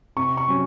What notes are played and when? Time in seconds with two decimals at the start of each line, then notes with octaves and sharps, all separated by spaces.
0.16 C3 C#6
0.37 C#6
0.48 F#3 C#4